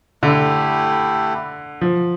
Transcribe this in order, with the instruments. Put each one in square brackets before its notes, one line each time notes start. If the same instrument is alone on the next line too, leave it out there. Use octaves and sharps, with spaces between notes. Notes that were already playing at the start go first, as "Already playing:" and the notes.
[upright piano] D3 [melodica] A3 E4 G4
[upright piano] F3